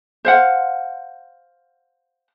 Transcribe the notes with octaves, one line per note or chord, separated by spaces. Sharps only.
C5 F5 F#5